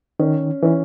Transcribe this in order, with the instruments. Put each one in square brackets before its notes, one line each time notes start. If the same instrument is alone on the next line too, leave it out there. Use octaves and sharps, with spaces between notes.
[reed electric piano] D#3 [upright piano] C#4
[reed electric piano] E3 [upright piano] C#4